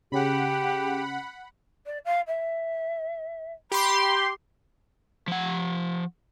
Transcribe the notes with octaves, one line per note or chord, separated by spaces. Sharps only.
C#3 C#4 G4 G#4 F#5 B5
D5
F5
E5
G4 B5 C6
F3 F#5